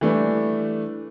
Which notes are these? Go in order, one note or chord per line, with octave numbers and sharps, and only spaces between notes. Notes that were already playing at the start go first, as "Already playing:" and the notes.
E3 G3 A3 D4